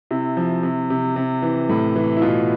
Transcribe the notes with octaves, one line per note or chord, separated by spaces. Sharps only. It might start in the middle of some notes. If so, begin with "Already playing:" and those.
C3 E4
F3
C3
C3
C3
E3
A2
E3
E4
B2 F4